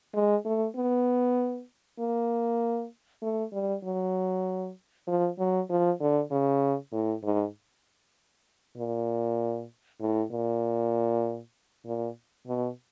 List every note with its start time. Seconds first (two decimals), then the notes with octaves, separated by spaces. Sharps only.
0.14 G#3
0.45 A3
0.76 B3
1.99 A#3
3.22 A3
3.53 G3
3.84 F#3
5.07 F3
5.39 F#3
5.70 F3
6.00 D3
6.31 C#3
6.92 A2
7.23 G#2
8.78 A#2
10.01 A2
10.32 A#2
11.86 A#2
12.47 B2